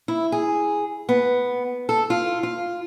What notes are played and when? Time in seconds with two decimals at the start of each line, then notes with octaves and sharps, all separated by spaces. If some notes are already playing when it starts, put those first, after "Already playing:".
0.08 E4
0.32 G#4
1.09 B3
1.89 A4
2.10 F4
2.43 F4